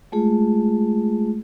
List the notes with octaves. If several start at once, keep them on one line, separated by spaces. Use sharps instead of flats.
G#3 A3 F4 G#4